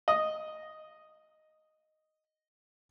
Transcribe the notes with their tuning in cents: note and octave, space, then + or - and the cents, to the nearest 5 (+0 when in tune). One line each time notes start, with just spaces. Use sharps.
D#5 +0